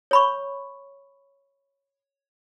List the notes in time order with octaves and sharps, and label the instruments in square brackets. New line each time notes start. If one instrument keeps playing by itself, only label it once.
[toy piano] C#5 B5 C#6